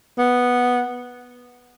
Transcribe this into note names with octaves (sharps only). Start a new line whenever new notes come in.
B3